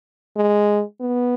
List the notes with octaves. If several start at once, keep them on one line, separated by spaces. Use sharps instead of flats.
G#3
B3